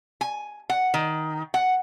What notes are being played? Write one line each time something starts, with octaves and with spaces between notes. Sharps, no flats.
G#5
F#5
D#3
F#5